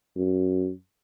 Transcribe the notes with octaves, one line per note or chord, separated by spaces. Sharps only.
F#2